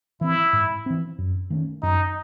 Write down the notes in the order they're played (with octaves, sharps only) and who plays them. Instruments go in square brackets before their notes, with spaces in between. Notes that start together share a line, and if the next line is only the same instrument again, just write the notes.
[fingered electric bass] E3 C4 [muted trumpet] E4
[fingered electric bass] G#2
E3 C4
F#2
D#3 A3 C#4
[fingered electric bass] F#2 [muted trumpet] D#4